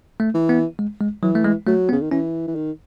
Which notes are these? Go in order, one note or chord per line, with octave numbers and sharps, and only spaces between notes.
A3
E3
B3
G#3
G#3
E3 F#3
A3
G#3
F#3 A3
B3
C#3
D#3
E3 C#4
E3
D#3